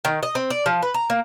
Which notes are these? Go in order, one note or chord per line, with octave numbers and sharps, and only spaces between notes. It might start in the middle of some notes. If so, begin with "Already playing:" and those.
D#3
D#5
C4
D5
F3
B4
A#5
A#3